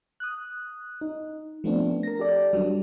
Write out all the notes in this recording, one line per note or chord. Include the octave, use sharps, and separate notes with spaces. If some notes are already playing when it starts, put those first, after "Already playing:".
D#6 F#6
D#4
F3 A3 B3 C4 D4
A#4 A#6
G4 A4 D5
F#3 G3 D4